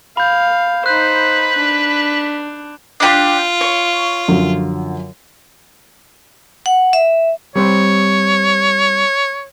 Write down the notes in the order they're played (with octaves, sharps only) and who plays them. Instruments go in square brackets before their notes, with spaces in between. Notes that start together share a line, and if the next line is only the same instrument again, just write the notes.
[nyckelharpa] F5 [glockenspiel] B5 G6
[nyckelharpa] D#4 C5 [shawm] B4 [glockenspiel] F#6
[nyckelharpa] D4
[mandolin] D4 G4 [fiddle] F4
[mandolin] C#5
[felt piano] F#2 D3 F3
[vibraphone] F#5
E5
[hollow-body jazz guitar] G3 C4 C5 [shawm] C#5